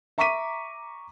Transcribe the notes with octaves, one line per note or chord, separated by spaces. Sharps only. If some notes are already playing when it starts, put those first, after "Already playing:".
E5 A#5 C#6 D6 B6 D#7